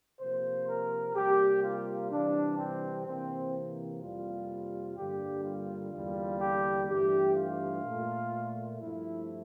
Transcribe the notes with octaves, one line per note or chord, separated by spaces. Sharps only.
C3 F3 A#3 C5
A#4
C3 G3 A#3 G4
F4
C3 E3 G3 D4
C4
C3 E3 A#3 C4
F2 C3 G3 A#3 F4
G2 D3 G3 A#3 G4
F4
E2 D3 G3 A#3
G4
G2 E3 A3 G4
F4
A#2 A3
G2 F3 A3 E4